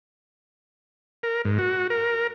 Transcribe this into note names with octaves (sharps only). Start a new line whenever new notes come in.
A#4
G#2
F#4
A#4